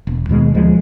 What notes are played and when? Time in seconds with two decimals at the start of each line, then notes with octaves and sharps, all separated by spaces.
0.07 E1
0.29 D#2 B2 G#3
0.55 D2 F3 G#3